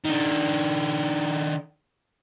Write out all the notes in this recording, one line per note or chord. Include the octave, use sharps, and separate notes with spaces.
D#3 D4